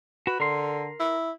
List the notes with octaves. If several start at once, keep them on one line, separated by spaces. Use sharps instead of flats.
F#4 B4
D3 A#4 C6
E4